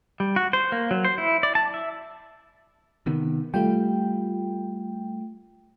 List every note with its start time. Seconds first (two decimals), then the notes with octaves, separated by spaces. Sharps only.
0.20 G3
0.36 F#4
0.53 C5
0.72 A#3
0.91 F#3
1.05 C5
1.18 E4
1.43 D5
1.55 A5
1.74 E5
3.06 C3 D#3 B3
3.54 G3 A3 F4 G5